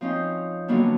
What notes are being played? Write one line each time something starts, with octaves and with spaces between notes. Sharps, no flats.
F3 C4 C#4 D#4
D3 F#3 G3 A#3 B3 D4